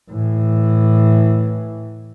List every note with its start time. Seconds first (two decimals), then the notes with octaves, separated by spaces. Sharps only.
0.11 A2 E3